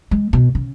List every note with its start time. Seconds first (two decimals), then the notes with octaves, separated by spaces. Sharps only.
0.11 G#3
0.33 B2
0.55 C#3